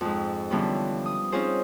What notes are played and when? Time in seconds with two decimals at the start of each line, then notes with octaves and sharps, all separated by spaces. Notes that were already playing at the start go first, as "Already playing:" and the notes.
0.01 F2 G#2
0.50 D3 E3 F3 G3 B3 C#4
1.06 D#6
1.32 C4 C#4 D#4 F4 G#4 C5